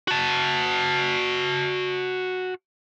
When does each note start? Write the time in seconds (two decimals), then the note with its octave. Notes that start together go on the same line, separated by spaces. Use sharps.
0.08 F#4 A5